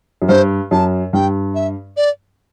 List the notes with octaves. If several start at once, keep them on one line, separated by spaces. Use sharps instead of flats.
F#2
G2 C5
F#2 A5
G2 G5
E5
D5